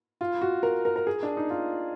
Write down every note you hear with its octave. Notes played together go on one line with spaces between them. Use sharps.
F4
F#4
A#4
A#4
A#4
G#4
D4
D#4
F4